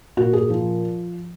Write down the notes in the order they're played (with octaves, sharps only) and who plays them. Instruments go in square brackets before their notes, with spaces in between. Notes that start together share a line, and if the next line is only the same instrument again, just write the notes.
[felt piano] A#2 F#4
G#4
F3